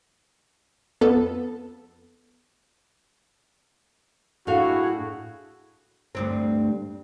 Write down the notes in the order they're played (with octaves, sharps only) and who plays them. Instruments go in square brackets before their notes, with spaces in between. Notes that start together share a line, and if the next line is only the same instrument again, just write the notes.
[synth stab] F2 B3 A4
[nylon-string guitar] A2 F5 [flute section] D4 E4 G#4 [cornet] F#4
[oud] D2 G2 C4